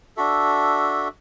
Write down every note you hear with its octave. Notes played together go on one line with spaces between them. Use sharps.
D4 F#4 A4 E5